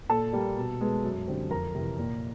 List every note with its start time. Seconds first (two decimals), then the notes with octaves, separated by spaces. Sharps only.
0.09 A#2 A4 A5
0.33 G3 A#3
0.57 B2
0.81 G#3 B3
1.04 F#2
1.28 D3 G3 C4
1.51 F2 A#4 A#5
1.75 C3 E3
1.98 A#2